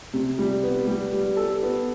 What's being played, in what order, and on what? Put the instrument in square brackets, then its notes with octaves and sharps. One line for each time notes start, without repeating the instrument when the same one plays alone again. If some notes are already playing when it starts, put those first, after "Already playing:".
[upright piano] C3
G3
B3
G3
G3
A4
B3